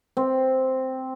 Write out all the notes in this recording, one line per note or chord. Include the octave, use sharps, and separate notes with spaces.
C4